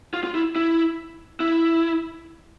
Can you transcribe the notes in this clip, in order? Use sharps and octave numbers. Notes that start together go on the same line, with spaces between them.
F4
F4
E4
E4
E4